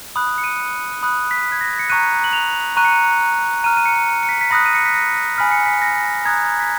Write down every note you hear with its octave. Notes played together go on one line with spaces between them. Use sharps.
B5 D#6 F#6
C#7
D#7
B5 D#6 F#6
B6
G#6
A#6
C#7
A#5 C#6 F#6 D#7
F#7
F7
A#5 C#6 F#6 D#7
C#7
D#7
A#5 F6 D#7
D#7
C#7
C#7
B6
B6
B5 D#6 F#6 A#6
D#7
C#7
B6
A#6
G#5 B5 F6 B6
C#7
B6
A#6
A#5 D#6 F#6 G#6
B6